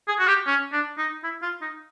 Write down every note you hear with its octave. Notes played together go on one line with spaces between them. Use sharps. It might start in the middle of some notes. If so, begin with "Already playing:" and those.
G#4
F#4
G4
C#4
D4
D#4
E4
F4
D#4